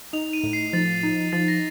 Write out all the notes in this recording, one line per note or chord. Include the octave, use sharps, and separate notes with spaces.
D#4 F7
D#7
A2
C7
F3 A6
D#4
F3 A6
A#6